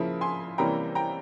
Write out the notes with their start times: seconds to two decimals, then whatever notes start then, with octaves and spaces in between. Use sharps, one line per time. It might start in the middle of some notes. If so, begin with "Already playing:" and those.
Already playing: C#3 F3 A#3 E4
0.21 G#5 C6
0.58 C3 E3 G3 A#3 C#4 G5 A#5
0.95 G5 A#5